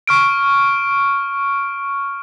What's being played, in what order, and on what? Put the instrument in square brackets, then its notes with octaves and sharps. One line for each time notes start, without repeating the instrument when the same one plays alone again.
[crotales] C#6 F6 D7